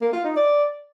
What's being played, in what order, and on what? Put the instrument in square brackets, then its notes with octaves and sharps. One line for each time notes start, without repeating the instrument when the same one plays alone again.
[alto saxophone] A#3
F4
D#4
D5